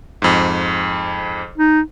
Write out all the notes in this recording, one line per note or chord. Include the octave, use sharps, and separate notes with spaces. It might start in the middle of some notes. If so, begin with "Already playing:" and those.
F2 G#2
D#4